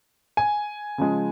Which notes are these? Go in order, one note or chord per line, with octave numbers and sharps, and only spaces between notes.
G#5
C#3 F3 G#3